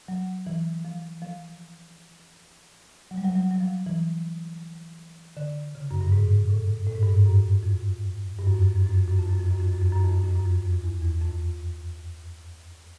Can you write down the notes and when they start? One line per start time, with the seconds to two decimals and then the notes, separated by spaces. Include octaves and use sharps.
0.08 F#3
0.47 E3
0.85 F3
1.22 F3
3.11 F#3
3.17 G3
3.24 F#3
3.35 F#3
3.51 F#3
3.60 F3
3.86 E3
5.37 D3
5.75 C#3
5.91 F#2
6.01 G2
6.12 G#2
6.50 A2
6.87 A2
6.95 G#2
7.03 G2
7.11 G#2
7.26 F#2
7.63 F2
8.38 G2
8.47 F#2
8.54 F2
8.62 F#2
8.76 F2
8.86 F#2
8.98 F2
9.08 F#2
9.19 F2
9.30 F#2
9.40 F2
9.51 F#2
9.60 F2
9.71 F#2
9.82 F2
9.92 F#2
10.04 F2
10.14 F#2
10.24 F2
10.36 F#2
10.46 F2
10.65 F2
10.84 E2
11.02 E2
11.22 F2